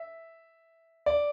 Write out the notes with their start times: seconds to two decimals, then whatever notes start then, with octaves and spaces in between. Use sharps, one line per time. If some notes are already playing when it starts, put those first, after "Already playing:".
Already playing: E5
1.06 D5